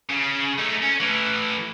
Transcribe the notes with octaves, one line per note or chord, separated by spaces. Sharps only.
C#3
A3 D#4
C#4
A2 E3